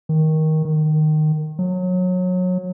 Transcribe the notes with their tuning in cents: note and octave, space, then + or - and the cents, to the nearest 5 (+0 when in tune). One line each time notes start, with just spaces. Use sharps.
D#3 +15
D#3 -15
F#3 -25